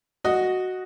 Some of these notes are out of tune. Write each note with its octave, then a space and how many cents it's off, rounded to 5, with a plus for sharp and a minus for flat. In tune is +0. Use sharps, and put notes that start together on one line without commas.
F#4 +0 D#5 +0